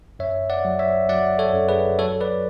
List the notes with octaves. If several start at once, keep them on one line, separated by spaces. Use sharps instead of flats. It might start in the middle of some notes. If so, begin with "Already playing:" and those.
F#2 C#5 E5
D5 F#5
F#3
C#5 E5
F#3 D5 F#5
A4 C#5
F#2
G#4 B4
F#3 A4 C#5
B4 D5